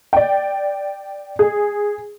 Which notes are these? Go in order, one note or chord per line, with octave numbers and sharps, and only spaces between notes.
D5 G5
G#4